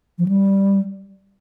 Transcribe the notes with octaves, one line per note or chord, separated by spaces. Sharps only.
F3
G3